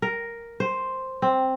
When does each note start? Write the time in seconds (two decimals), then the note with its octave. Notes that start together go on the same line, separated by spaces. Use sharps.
0.02 A#4
0.60 C5
1.22 C4